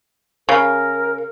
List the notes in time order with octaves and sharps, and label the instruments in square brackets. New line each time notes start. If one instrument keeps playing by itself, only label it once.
[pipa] C#3 [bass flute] A#4